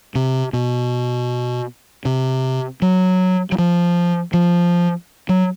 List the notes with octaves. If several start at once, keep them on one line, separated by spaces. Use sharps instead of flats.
C3
B2
C3
F#3
F#3
F3
F3
F#3